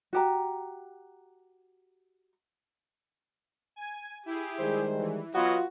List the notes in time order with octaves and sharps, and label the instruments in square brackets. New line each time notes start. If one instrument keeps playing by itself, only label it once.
[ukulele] F#4 G4 A#5
[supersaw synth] G#5
[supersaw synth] E4 G#4 [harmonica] G4
[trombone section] D#3 G3 G#3 [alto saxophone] C5
[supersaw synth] E3
[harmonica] F#3 B4 D#5 [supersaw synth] B3 [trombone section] F4 [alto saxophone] F#4